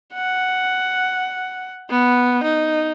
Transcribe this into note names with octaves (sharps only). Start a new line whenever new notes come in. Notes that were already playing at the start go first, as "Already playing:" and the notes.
F#5
B3
D#4